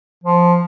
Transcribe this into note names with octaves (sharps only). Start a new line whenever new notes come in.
F3